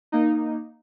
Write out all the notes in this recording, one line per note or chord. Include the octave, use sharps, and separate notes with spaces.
A#3 D#4